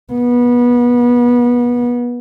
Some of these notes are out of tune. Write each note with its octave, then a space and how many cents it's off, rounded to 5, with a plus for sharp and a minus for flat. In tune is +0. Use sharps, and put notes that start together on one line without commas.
B3 -25